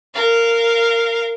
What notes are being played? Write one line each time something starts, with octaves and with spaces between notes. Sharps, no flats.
A#4 F5